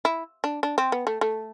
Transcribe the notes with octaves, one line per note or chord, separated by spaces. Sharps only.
E4
D4
D4
C4
B3
A3
A3